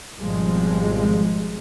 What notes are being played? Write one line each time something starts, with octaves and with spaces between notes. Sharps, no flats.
G#1 B2 F3 G3 G#3